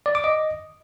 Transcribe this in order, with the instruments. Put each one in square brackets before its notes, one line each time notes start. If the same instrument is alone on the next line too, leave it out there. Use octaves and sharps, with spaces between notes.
[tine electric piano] D5
D6
D#5